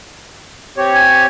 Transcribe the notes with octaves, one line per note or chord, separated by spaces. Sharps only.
C4 G4 C#5
G#5